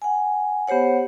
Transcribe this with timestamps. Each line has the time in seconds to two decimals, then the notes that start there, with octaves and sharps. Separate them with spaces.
0.02 F#5 G#5
0.67 B3 G4 C5 C#5 F#5